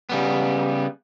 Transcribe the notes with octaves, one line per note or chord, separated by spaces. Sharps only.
C#3 G3 B3